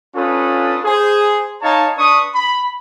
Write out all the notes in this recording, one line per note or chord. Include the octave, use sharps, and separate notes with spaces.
C#4 D4 F4 A4 B4 D#6
G#4 C5
D#4 C#5 F5 A5
D4 B4 C#6 D#6
B5